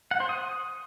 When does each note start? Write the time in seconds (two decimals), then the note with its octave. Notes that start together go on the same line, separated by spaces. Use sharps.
0.11 F#5
0.20 C5
0.29 D#6